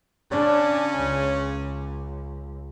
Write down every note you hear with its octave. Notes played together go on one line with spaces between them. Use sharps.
C#3 C#4 D4
C#2